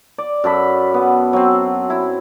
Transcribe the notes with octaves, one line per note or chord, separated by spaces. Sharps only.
D5
F#2 A4 B5
B3
F#3 C4
E4